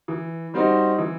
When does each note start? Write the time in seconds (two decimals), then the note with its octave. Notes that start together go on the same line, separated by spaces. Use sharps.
0.08 E3
0.54 G3 C4 D#4 F#4
0.98 E3